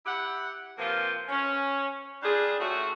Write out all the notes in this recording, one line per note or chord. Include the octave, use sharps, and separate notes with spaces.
E4 G4 F#5
C3 F3 A#3 F4 B4
C#4
G3 D4 F4 G#4
A2 A3 C#4 F#4